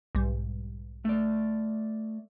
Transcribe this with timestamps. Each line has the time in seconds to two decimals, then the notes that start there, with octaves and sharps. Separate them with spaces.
0.15 B1 G#2 G3
1.05 A3 D5